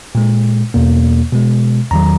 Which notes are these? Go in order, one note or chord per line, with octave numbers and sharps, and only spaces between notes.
A#2 G#3
E2 B2 A#3
B2 G#3
E2 D#3 F#3 A#5